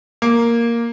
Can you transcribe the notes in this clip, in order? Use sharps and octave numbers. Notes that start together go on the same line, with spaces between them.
A#3